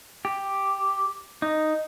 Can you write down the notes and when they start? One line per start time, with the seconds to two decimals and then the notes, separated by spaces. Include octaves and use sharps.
0.25 G4
1.42 D#4